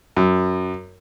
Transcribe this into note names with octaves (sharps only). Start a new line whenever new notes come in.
F#2